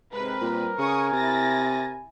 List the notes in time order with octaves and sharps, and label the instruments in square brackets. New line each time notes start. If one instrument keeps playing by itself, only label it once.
[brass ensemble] G#2 C3 G#3 [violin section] C4 B4 [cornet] A#4
[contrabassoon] A#2 [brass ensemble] G3
[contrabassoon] C#3 [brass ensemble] G#5 [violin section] C#6 D#6
[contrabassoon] C3 [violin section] E4 A6 A#6